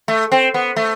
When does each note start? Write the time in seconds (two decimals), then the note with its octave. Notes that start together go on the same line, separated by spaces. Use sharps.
0.08 A3
0.32 C4
0.54 B3
0.76 A3